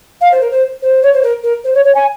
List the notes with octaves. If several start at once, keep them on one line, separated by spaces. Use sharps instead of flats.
F5
C5
A#4
C5
C5
C#5
C5
A#4
A#4
C5
C#5
C#5
G#5